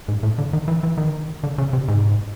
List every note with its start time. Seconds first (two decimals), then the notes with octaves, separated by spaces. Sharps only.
0.08 G#2
0.23 A2
0.38 D3
0.53 D#3
0.68 E3
0.83 E3
0.98 D#3
1.43 D3
1.58 C#3
1.73 C3
1.88 G#2